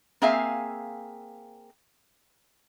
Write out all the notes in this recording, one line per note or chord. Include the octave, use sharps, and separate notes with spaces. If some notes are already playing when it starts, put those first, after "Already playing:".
A#3 C4 G#4 E5 F5 G#5